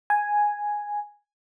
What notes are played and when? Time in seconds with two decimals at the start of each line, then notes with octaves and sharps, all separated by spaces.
0.10 G#5